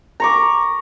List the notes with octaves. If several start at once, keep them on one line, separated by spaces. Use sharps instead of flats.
A#5 C#6 D6